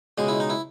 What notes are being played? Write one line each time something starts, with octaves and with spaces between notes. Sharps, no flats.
C#2 B2 G#3 G#4
E4
D#4
E4